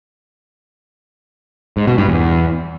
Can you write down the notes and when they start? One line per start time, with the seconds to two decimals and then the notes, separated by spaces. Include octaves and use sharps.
1.77 G#2
1.87 B2
1.98 G2
2.09 E2